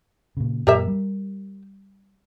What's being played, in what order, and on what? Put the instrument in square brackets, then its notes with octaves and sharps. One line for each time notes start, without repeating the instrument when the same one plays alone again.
[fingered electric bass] A#2 C#3
[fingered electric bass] F#2 A#2 [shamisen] G4 A#4 E5
[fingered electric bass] G3